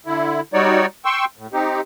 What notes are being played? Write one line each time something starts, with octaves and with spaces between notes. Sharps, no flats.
D3 E4
G3 D#4 F#4 C#5 D5
G5 C6 C#6 E6
A2
C4 D#4 G4